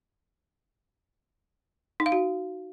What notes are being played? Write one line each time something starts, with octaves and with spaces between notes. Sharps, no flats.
D#4
F5
F#4